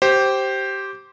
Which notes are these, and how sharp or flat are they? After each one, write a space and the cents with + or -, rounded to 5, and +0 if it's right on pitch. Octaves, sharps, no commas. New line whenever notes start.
G4 -15 C5 +5